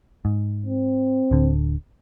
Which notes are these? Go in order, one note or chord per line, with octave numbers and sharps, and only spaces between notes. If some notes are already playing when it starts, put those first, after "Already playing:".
G#2
C4
D1 D3